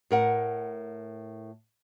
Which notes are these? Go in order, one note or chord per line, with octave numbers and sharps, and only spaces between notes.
A2 A#4 F#5